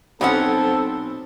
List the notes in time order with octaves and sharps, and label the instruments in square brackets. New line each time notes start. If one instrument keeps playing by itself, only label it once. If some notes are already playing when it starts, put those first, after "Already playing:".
[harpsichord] B1 [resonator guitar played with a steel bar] B2 C#4 F#5 [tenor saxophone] C4 [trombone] A4